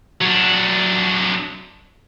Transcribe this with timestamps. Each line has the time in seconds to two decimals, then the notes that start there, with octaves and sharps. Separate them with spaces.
0.21 F#3 D4